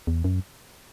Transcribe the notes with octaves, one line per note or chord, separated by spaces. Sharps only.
E2
F#2